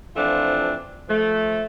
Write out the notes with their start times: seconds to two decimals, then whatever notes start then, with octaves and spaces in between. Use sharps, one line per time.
0.16 E3 F3 A3 C4 D4 F4
1.08 F3 A3